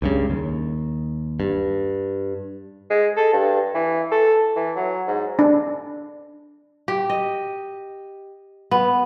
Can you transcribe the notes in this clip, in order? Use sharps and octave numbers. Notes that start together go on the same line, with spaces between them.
C#2 G2 C#3
D#2
G2
G#3
A4
G2
E3
A4
E3
F#3
G#2
D4
G4
D#5
B3